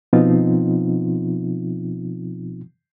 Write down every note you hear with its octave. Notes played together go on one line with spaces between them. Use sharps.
B2 F3 B3 C4 D#4 F4